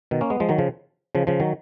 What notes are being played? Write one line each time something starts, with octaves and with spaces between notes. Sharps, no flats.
B2 D#3
A#3 C#4
G#3 B3
F3 G#3
D#3 F#3
C#3 F3
C#3 F3
C#3 F3
D#3 F#3